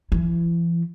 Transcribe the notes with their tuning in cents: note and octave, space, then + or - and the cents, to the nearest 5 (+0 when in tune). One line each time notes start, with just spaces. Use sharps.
E3 +45 E4 +30